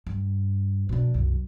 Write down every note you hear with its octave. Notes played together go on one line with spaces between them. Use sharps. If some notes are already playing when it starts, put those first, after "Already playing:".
G2
B2 D4
C2 F#2